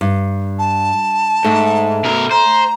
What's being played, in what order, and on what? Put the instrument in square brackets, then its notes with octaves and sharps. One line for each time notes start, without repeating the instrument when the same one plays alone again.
[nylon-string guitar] G2
[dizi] A5
[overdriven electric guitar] G#2 [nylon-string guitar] A3
[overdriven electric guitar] B2 A#4
[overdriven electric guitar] C5 [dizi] A#5